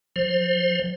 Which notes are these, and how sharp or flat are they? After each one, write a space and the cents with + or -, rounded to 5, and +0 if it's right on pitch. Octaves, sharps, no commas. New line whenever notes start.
F3 +35 C5 +5